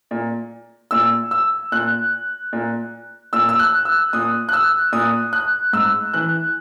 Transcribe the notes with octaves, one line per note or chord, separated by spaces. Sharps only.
A#2
A#2 E6
E6
A#2 F#6
A#2
A#2 E6
E6
F#6
E6
A#2 D#6
F#6
E6
A#2 D#6
F#6
G#2 E6
E3 F#6